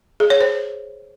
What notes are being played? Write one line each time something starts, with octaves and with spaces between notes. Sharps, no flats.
G#4
C#5
C5